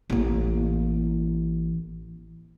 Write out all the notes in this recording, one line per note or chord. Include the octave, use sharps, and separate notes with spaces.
A1 A#3